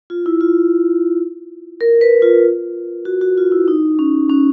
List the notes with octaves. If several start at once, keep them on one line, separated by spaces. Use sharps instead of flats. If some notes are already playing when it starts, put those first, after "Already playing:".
F4
E4
F4
A#4
B4
F4
F#4
F#4
F4
E4
D#4
C#4
C#4